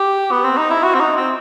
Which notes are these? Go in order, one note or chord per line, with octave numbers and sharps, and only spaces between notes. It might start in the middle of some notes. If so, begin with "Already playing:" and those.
Already playing: G4
B3
C4
D#4
E4
F#4
C4
D#4
C4